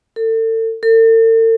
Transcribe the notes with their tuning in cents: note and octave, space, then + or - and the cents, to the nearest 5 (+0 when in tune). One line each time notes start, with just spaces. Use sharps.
A4 +35
A4 +45